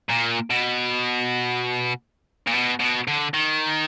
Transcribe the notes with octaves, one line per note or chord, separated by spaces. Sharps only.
A#2
B2
A#2
B2
B2
D3
D#3